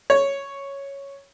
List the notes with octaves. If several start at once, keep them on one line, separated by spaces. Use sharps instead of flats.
C#5